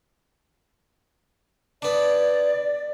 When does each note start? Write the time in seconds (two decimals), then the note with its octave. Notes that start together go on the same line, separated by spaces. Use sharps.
1.82 B3 D4 D5